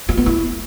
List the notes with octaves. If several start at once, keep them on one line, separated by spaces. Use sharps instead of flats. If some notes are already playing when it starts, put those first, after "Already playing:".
F4
B3
E4